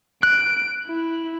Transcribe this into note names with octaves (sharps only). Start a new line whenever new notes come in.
F#6 D7
E4